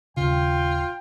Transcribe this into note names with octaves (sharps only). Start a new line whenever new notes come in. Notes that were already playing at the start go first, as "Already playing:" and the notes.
D#1 C#3 F4 G5